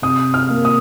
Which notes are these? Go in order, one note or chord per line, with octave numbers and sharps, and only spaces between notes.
C3 D#6
F6
A#3
D#6